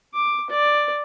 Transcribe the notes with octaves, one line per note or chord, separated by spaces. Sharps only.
D6
D5